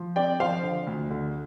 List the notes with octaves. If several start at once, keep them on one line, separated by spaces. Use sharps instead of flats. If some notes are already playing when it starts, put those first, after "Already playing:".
Already playing: F3
C4 D5 G5
F3 C5 F5
D3
D2
D3